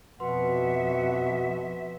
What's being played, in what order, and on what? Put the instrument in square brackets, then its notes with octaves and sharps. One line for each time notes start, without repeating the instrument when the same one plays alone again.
[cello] F2 E5 [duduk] B2 [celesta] F#4 B4 C6 [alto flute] F#5